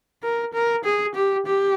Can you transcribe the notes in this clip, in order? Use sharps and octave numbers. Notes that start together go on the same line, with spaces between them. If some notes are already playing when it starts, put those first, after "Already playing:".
A#4
A#4
G#4
G4
G4